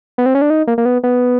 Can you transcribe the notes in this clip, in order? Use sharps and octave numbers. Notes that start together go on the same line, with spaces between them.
B3
C4
C#4
D4
D#4
A#3
A#3
B3
B3